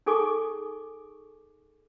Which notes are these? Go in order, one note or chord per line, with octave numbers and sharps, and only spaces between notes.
D#4 G#4 A4 G#5 C#6 D6